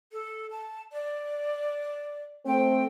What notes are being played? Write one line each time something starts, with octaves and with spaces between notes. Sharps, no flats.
A4
A5
D5
A3 C4 G5